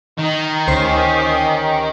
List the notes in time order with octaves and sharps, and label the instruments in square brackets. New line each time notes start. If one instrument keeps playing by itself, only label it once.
[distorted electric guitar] D#3 [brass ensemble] D#4
[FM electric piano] D2 C5 C7 [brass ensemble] C#4 G4